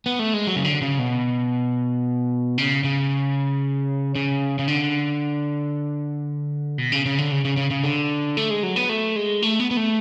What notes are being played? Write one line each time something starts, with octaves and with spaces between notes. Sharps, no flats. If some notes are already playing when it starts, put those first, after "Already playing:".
B3
A3
G#3
F#3
C#3
D3
C#3
B2
C#3
C#3
C#3
C#3
D3
B2
C#3
C#3
D3
C#3
C#3
C#3
C#3
D3
A3
G#3
F#3
B3
A3
G#3
A3
B3
B3
A3